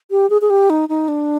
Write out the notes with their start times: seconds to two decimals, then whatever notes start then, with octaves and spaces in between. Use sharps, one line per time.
0.11 G4
0.30 G#4
0.41 G#4
0.50 G4
0.70 D#4
0.89 D#4
1.08 D4